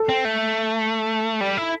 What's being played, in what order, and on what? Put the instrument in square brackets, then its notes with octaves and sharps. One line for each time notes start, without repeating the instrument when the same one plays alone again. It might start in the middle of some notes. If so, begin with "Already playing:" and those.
Already playing: [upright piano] A4
[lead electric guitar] C4
A3
G3
E4